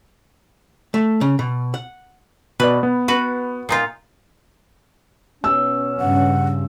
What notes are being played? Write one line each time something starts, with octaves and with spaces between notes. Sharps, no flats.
A3
C#3
B2
F#5
B2 B4 D5
B3
F#4 B4
A#2 D#4 F4
B2 B3 C#4 E6
G2 C#3 F#5